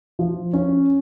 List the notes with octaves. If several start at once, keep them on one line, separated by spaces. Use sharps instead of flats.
F3
C#4